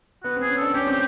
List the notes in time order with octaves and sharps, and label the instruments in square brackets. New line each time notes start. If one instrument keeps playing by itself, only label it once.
[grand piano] B3 [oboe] F#4
[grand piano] C4
[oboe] G#4
[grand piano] C#4
[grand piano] D4 [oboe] A4
[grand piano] C#4 [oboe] G4
[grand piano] C4 [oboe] G4